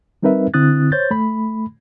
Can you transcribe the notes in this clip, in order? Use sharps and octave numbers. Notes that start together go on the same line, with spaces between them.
G3 C4 D#4 A#4 B4 E5
D3 C4 E4 D#6 F#6 A6
C5 C#5 G6 A6
A3 B5